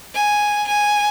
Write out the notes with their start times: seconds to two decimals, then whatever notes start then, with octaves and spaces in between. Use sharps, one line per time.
0.14 G#5
0.67 G#5